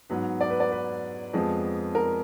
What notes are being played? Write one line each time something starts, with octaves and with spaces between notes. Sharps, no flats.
G#2 F#3 B3 B4
D5
B4
D5
B4
F2 F3 G#3 B3
A#4